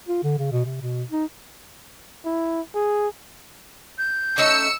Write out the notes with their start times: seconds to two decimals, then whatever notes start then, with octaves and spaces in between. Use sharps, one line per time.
0.08 F4
0.23 D3
0.39 C#3
0.52 B2
0.65 C3
0.81 B2
1.11 D#4
2.25 E4
2.75 G#4
3.98 G6
4.38 A3 C#4 D#4 E6 C#7